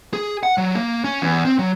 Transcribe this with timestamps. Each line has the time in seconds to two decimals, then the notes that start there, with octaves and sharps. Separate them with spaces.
0.13 G#4
0.43 F#5
0.58 F#3
0.75 A#3
1.04 C#4
1.22 E2
1.45 C4
1.59 F#3